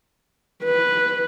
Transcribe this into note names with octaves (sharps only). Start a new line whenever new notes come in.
B4